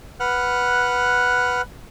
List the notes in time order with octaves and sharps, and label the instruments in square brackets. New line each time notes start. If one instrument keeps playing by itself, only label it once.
[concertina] B4 F#5 F6 F#6